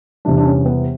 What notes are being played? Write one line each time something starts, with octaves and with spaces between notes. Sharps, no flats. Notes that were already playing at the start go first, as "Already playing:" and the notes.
E2 C3 E3 G3 D4
D4
C#4
B3